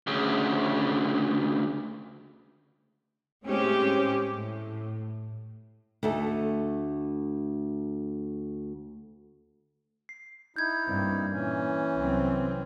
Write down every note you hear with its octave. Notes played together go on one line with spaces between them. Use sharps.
D2 C#3
A2 G#3 C4 C#4 G4
A2
D2 A3 D#4 A4
C7
D#4 E4 G6 G#6
G2 A#3 C4
A#2 E3 C#4
C2 F#3 C4